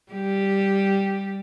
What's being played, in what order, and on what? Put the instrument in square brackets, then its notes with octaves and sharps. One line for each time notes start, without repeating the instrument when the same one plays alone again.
[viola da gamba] G3 G4